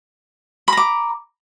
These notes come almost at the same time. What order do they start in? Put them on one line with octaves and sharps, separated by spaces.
B5 A#5 D6